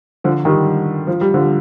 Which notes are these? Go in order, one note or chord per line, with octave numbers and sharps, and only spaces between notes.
D3 F3
D#3 G3
F3
G3
D3 F3